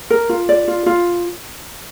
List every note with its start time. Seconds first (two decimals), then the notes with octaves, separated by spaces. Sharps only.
0.10 A#4
0.29 F4
0.49 D5
0.68 F4
0.86 F4